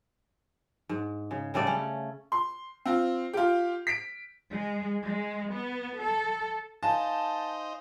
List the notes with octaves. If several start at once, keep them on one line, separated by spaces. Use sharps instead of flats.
G#2
C#3
C#3 G3 A3 D5
C#4
C6
C4 F4
F4 G4
B6 D7
G#3
G#3
B3
A4
D#4 C5 D#5 F5 G#5 A5